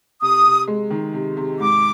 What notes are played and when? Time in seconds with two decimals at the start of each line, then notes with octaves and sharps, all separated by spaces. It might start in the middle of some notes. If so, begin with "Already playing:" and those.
0.21 C3 D#6
0.45 C3
0.68 G#3
0.90 D#3
1.14 C3
1.37 C3
1.59 G#2 D6